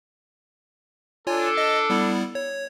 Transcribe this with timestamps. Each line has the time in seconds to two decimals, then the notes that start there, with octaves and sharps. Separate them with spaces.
1.27 D4 F4 A4 C#5 G#5
1.57 D#5
1.90 G3 B3 E4
2.35 C#5